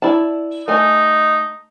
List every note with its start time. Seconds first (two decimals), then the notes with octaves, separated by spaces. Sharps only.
0.02 E4 D5 A5
0.68 A3 D#4 G#5